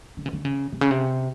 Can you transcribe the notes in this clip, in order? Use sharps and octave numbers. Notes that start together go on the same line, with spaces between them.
D3
C#3
D3
C#3
C3
C#3
C3